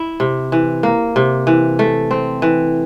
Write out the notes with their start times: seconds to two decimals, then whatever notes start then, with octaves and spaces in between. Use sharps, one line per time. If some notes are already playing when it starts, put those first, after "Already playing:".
Already playing: E4
0.20 C3
0.52 E3
0.83 A#3
1.16 C3
1.47 E3
1.79 A3
2.11 C4
2.42 E3